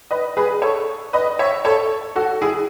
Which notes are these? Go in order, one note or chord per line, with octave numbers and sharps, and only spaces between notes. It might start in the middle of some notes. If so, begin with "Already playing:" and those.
B4 D#5
G#4 B4
A4 C#5
B4 D#5
C#5 E5
A4 C#5
F#4 A4
E4 G#4